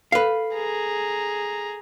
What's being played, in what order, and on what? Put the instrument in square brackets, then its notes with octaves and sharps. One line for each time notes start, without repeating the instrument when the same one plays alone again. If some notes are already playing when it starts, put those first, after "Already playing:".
[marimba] A4 [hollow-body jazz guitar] B4 F5
[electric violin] G#4 A#5